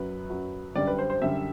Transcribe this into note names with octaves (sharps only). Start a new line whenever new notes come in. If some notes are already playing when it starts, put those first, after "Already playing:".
Already playing: F#2 F#3 B4
F#2 F#3
F#2 D3 G3 D5
B4
C5
C5
F#2 D3 G3 E5